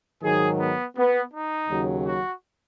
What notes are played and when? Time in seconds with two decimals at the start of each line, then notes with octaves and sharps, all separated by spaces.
0.22 G#2 D#3 F#3 G#4
0.59 B3
0.96 B3
1.32 D#4
1.69 D#2 C#3 F#3
2.05 F#4